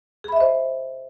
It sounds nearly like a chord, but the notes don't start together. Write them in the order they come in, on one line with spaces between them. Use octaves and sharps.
G#4 B5 E5 D#5 C5